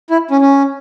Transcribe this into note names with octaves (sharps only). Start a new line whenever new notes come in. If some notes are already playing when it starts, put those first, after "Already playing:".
E4
C#4
C#4